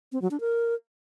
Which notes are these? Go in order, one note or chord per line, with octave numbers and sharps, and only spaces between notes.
C4
F#3
D4
A#4